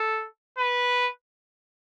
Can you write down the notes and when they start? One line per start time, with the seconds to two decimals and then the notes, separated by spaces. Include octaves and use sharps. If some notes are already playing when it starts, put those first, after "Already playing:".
Already playing: A4
0.58 B4